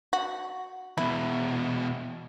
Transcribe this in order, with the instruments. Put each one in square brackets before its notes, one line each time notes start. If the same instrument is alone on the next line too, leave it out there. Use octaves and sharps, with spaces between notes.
[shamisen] F#4
[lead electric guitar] E2 B2 [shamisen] E4